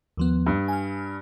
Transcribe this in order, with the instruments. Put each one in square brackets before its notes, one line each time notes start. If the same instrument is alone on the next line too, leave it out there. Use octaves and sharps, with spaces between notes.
[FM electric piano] D#2 F3 B3
[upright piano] G2
[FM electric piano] G#5 F6